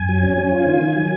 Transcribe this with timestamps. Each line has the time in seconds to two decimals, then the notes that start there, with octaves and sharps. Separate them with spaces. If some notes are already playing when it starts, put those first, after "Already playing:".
Already playing: F#2 G#5
0.09 F#3
0.23 C#4
0.38 C#4
0.52 F4
0.67 D#3
0.82 D#3
0.96 F#3